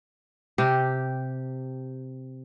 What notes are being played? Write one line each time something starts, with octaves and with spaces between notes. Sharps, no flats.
C3 G4